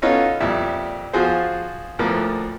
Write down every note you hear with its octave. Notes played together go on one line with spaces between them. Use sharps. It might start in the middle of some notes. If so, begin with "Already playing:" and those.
B3 C#4 D#4 F4 A4 C#5
F2 A#2 G3 E5
F3 F4 F#4 G#4 C5
D2 A2 F3 A#3 B4